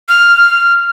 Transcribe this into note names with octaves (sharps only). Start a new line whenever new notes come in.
F6